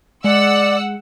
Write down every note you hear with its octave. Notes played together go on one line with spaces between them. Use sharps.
G#3 D5 F#5 E6